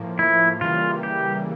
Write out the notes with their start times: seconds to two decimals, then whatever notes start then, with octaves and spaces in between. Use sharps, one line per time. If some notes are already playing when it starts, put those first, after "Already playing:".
Already playing: A2 F3 A#3
0.19 E4
0.61 C#3 E3 G3 A#3 F4
1.03 G4